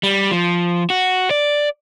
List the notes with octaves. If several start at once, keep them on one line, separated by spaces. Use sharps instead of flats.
G3
F3
F#4
D5